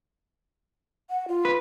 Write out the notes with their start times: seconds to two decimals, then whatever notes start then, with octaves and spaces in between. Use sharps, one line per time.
1.10 F#5
1.28 F4
1.45 B4